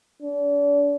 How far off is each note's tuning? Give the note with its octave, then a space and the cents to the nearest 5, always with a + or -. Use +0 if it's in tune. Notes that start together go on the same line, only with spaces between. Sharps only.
D4 -40